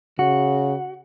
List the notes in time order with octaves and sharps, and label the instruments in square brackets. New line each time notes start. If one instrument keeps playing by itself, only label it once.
[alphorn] C#3 [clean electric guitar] F#4